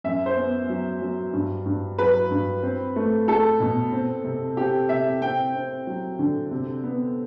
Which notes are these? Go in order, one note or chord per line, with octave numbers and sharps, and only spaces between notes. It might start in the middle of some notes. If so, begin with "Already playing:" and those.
F#2 E5
C5
B3
F#3
F#3
G2
G2
F#3 B4
G2
C4
A3
A3 A4
B2
C4
C3
C4 G4
C3 E5
C4 G5
C4
F#3
D3
C3
B3